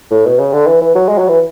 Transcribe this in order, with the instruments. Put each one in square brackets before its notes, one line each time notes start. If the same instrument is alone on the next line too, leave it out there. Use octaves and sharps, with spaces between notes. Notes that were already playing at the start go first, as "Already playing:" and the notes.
[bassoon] A2
B2
C#3
D3
E3
E3
F#3
G#3
F#3
E3